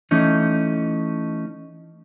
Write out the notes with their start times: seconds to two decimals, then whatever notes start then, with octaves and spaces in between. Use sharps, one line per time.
0.11 E3 A3 C#4 D#4